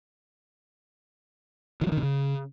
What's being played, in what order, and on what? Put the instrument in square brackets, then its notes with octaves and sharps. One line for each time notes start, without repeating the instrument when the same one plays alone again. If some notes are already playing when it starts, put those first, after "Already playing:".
[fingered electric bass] D#3
F#3
D#3
C3
C#3